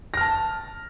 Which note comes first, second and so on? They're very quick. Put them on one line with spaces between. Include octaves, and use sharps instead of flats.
A#6 F6 A5